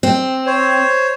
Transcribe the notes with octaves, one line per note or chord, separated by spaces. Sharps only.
C4
C5 C#5